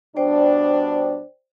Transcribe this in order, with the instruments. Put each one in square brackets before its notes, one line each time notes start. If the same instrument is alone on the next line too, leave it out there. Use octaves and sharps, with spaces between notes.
[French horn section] B2 G3 D4 [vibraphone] C5 D5 G5